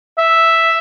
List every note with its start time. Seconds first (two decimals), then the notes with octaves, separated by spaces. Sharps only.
0.18 E5